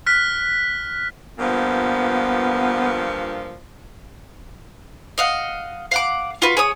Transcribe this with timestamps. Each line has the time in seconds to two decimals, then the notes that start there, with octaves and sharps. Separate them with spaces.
0.06 F6 F#6 B6
1.39 G2 A#2 F3 B3
5.18 D#5 F5 F#5
5.91 F5 F#5 D6
6.42 F4 F#4 B4
6.57 G#4 C#5 D#6